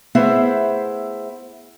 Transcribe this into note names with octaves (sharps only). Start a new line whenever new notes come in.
A3 B3 E4 G#4 C5 E5